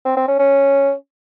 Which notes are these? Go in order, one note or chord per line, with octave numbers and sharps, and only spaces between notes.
C4
C4
C#4
C#4